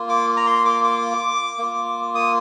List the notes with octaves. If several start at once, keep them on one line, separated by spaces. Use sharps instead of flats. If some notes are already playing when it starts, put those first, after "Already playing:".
Already playing: A#3 F4
D6
A#5
C6
D6
D6
A#3 F4
D#6